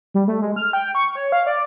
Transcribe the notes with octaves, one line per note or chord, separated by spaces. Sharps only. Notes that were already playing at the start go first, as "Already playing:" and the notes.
G3
A3
G#3
F6
G5
C#6
C#5
F5
D5